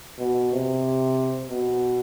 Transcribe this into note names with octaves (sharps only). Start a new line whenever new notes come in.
B2
C3
B2